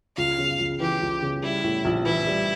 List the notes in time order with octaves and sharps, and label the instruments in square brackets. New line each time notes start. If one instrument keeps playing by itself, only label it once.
[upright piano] C#2 [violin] F5
[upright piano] C#3
C#2
[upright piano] E3 [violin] G4
[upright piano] C#2
C#3
[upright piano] G3 [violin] E4
[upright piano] A2
A#1
[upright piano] E3 [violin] E4
[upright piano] G3